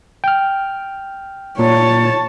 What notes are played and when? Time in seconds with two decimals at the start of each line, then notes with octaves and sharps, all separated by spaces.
0.24 G5 F6
1.59 A#2 C#5 A5